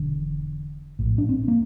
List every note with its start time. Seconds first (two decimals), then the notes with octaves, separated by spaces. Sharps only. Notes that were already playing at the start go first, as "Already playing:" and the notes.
Already playing: E1 E2 D3
0.99 A#1 A2
1.18 D4
1.29 C4
1.48 A#3